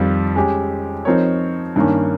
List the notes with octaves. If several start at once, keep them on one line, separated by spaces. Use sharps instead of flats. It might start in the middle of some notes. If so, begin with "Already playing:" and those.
Already playing: F2 D#3 G3 C4 F4
G#3 C#4 G4
F3 C4 D#4 A#4 C#5
G2 D#3 A#3 C#4